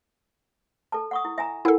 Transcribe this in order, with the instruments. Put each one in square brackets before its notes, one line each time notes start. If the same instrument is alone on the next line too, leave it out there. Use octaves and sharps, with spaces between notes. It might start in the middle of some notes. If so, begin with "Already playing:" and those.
[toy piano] A4 A5
F#5 C#6 D#6
E4
E5 G#5 A#5
[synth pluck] E4 A4 [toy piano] A#4 F#5 G#5